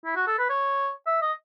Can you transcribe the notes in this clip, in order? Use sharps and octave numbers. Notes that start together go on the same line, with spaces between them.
E4
F#4
A4
B4
C#5
E5
D#5